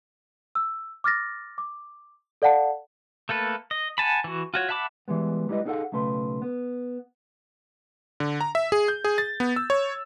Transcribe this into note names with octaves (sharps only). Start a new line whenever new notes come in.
E6
D6 F6 A6 A#6
D6
A4 D5 F5 F#5 A5
A3 A#3 A4 B4
D#5
F#5 G#5 A5 B5
E3 F#4
F4 F#4 C#5
E5 F#5 A5 B5 D6
E3 G3 G#3 B3
G3 G#3 E4 B4 D#5
B3 D#4 G#4 A4 F5 F#5
B1 C#3 A3 B4 C6
B3
D3
A#5
E5
G#4
G6
G#4
A6
B3
E6
C#5